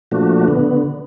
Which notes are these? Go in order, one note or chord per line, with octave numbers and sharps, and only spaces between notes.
A#2 F3 A3 D4 F#4
D3 B3